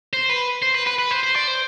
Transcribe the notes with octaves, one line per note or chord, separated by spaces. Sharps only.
C5
B4
C5
B4
B4
B4
C5
C5
D5
C5